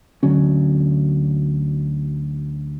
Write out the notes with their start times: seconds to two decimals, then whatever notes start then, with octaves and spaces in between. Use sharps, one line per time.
0.23 D2 D3 F#3 C#4